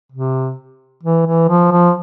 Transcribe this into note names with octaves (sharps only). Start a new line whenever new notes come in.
C3
E3
E3
F3
F3